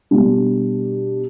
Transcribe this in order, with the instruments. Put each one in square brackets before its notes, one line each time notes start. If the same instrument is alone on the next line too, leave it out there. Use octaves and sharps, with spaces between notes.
[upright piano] B2 G3 D4